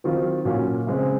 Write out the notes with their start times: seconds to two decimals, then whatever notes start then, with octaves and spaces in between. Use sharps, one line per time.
0.04 D#3 F#3 C4 F4
0.45 A#2 F#3 C#4 F#4
0.87 C#3 G#3 C4